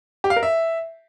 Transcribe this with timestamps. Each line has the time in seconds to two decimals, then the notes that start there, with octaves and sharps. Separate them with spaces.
0.24 G4
0.30 F5
0.36 A#4
0.43 E5